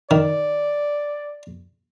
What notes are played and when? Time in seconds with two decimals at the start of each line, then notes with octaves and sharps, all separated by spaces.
0.11 D#3 D5